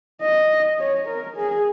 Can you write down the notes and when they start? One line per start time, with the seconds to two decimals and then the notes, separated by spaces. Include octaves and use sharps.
0.21 D#5
0.79 C#5
1.07 A#4
1.37 G#4